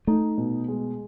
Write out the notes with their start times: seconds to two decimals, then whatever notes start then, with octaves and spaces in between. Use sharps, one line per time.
0.07 A3 D#4
0.38 B2
0.68 G#3